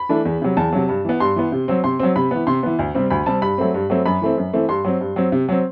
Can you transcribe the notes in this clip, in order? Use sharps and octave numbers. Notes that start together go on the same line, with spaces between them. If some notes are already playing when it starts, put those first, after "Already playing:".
Already playing: B5
E3 A3 D4
E2
C3 F#3
E2 A5
C3 F#3
G2
E3 B3
G2 C6
E3 B3
C3
F#3 C4
C3 C6
F#3 C4
C3 B5
E3 B3
C3 C6
E3 B3
D2
C3 G3 C4
D2 B5
C3 G3 C4 A5
G2 B5
F#3 A3 C4
G2
F#3 A3 C4
F#2 B5
E3 A3 C4
F#2
E3 A3 C4
G2 C6
F#3 C4
G2
F#3 C4
C3
F#3 C4